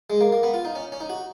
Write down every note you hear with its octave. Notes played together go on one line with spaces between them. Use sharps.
G#3
A#3
A#3
B3
F4
D#4
C#4
C#4
D#4
F#4